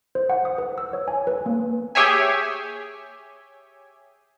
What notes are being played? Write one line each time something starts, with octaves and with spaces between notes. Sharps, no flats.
C5
F#5
D#6
B4
E6
C#5
G#5
B4
A#3
G4 G#4 C#5 E5 G#5